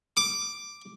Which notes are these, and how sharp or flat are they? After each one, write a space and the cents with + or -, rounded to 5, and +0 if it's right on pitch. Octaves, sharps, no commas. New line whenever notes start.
D6 +5